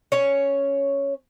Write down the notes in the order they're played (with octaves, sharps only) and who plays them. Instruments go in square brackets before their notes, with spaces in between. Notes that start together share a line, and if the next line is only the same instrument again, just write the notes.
[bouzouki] C#4 C#5